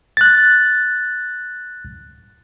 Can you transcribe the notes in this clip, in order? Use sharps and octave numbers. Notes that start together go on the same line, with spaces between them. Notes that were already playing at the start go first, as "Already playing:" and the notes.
F#6 A6